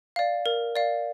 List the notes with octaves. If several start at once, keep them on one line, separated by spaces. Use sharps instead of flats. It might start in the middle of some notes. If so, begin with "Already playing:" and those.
D5 F5
A#4
D5 F5